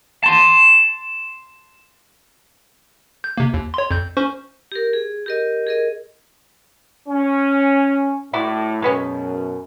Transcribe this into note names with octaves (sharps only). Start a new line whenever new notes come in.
A5 C6
G6
C3 A#3
D#2
C#5 C6
F2 G6
C#4 C5 C#6
G4 A#4
G#4
G4 A#4 D#5
G#4 A#4 D#5
C#4
A2 E4 F#4 D5
F#2 B2 G#3 B3 C#4